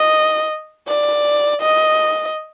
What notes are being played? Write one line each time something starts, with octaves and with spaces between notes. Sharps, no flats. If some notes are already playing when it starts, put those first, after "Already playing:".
Already playing: D#5
D5
D#5